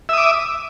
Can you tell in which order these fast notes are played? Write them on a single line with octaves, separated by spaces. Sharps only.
E5 D#6 D6